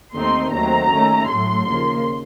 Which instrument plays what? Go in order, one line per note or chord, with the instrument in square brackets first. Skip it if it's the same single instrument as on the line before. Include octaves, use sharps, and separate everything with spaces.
[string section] D#2 D#3 A3 C4 D#4 C6
D#2 D#3 F#3 A3 C4 A#5
D#2 D#3 A3 C#4
A2 F#3 A3 C6
D#2 C#3 F3 A#3